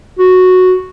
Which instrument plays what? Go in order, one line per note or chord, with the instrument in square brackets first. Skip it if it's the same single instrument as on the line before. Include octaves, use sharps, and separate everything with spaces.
[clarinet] F#4